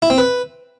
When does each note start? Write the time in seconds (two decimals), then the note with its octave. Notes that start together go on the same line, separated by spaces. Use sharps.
0.02 E4
0.10 C4
0.18 B4